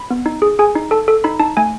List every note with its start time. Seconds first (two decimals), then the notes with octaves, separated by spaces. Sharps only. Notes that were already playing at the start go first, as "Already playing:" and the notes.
Already playing: B5
0.11 B3
0.26 D#4
0.42 G#4
0.59 G#4 G#5
0.75 D#4
0.91 A4 A5
1.08 A4
1.24 D#4 B5
1.40 D#4 A5
1.57 A3 G#5